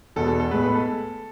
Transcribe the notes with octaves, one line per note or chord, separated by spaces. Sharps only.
E2 B2 G#3 B3 A4
A4
A4
A2 G#3 B3 B4
B4
A4